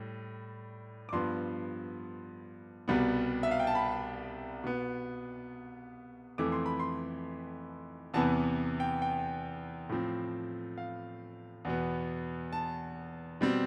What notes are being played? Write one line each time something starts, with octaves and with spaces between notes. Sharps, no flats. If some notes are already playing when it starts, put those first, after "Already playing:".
Already playing: A2 G3
D6
G2 F3 B3 C6
C2 B2 G3 B3
E5
F5
G5
A5
B5
B2 B3
F2 E3 A3 D6
C6
B5
C6
E2 C3 E3 B3 A5
G5
G5
A2 F3 C4
F5
E2 B2 B3
A5
B2 G3 C4